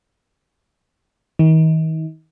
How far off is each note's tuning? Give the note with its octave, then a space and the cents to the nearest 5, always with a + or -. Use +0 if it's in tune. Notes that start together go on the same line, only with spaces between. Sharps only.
D#3 +40